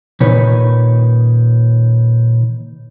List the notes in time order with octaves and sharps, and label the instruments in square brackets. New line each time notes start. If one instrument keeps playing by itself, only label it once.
[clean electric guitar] A#2 D#3 D#4 B4 C#5